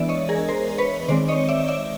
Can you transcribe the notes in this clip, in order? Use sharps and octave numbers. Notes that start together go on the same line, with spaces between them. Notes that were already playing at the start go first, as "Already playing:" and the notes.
Already playing: E3 G#3 B3 D4 D5 E5
C#5 D#5
G#4 A#4
A#4 C5
B4 C#5
D#3 G#3 C4 C5 D5
C#5 D#5
D5 E5
D5 E5